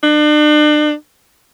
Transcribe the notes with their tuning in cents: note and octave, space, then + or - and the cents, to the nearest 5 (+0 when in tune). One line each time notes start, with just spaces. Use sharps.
D4 +40